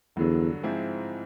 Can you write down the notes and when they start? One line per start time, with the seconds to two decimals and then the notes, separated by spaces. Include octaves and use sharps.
0.17 E2 G2 D3 F#3
0.63 G#2 F3 G#3 C4 E4